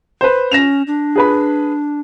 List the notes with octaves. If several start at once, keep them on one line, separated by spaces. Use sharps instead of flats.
B4 C5
C#4 A#6 E7 F7
D4
G#4 B4 B5